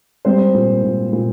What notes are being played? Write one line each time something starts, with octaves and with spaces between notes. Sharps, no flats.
G3 C4 C5
A#2
A#2
A#2